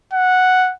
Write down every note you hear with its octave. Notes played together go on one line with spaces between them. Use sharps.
F#5